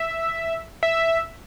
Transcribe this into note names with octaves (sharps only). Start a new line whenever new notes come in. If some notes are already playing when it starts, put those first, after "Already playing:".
Already playing: E5
E5